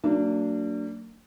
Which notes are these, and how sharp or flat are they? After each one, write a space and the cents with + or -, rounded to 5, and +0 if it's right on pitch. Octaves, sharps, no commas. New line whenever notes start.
F#3 +0 A#3 -40 D4 -10